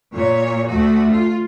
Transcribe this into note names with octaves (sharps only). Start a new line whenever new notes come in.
A#2 C#5
D2 A3 F#4
F4